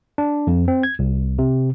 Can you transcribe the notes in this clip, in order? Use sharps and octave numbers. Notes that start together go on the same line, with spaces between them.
D4
F2
C4
G#6
C2
C3